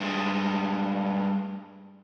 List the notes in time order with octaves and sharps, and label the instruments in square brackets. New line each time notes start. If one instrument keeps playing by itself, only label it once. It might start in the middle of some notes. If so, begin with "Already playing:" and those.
[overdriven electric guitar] G2 G#3